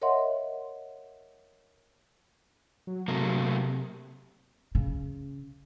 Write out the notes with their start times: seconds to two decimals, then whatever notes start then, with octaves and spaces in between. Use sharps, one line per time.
0.02 A#4 C#5 D#5 E5 F#5 C6
2.87 F#3
3.08 C3 F#3 A3 A#3
4.75 C#3